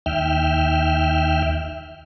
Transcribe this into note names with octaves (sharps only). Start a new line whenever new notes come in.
D#2 E5 G5 F6